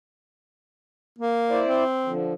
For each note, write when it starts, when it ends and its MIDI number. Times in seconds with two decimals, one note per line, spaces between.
1.18 1.61 58
1.50 1.84 64
1.50 1.84 72
1.50 1.84 74
1.67 2.13 60
2.06 2.34 50
2.06 2.34 53